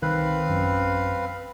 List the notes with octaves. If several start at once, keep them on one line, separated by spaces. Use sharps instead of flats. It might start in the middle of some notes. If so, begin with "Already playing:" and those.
C2 D#3 C4 B4 F5 F#6
A1 F#2